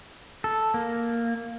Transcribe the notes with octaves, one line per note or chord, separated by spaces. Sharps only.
A4
A#3